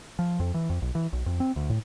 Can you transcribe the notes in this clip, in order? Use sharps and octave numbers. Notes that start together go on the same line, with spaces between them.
F3
F2
E3
F2
B1
E3
B1
F2
C4
D2
A2